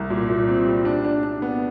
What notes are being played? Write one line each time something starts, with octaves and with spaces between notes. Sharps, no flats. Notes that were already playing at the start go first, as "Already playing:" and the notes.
Already playing: C2
A#2
A#2
C4
G3
D4
D4
D4
B3